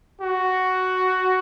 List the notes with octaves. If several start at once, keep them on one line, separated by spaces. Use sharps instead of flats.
F#4